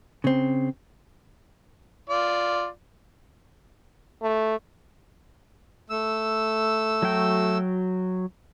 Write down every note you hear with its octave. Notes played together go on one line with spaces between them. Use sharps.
C#3 C4
F4 D5
A3
A3 E6
F#3 F#4 G5